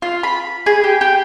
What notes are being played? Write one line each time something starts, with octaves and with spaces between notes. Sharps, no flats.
F4
B5
G#4
G4
G4